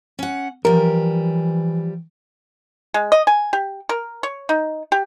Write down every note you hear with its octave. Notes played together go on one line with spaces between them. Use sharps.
C#4 F#5
E3 F3 G3 A#4
G#3
D#5
G#5
G4
A#4
C#5
D#4
G4